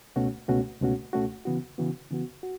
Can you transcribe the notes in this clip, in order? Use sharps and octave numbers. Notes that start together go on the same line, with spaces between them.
C#2 B2 A3 C#4 F#4
C#2 B2 A3 C#4 F#4
C#2 B2 A3 C#4 F#4
C#2 B2 A3 C#4 F#4
C#3 E3 B3 F#4
C#3 E3 B3 F#4
C#3 E3 B3 F#4
F#4